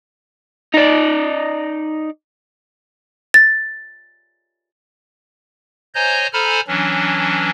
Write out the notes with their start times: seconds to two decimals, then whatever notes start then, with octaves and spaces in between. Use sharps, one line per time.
0.74 D#4 D5
3.34 A6
5.95 C5 C#5 D#5 G#5 A#5 G6
6.33 A4 C5 G#5 A#5 B5 F6
6.68 E3 F#3 C#4 D4